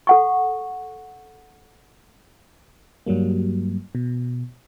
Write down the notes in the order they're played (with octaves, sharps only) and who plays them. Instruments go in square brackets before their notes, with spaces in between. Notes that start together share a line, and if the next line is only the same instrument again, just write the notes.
[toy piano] A4 F#5 C#6
[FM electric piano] G2 F#3 G3 A#3
B2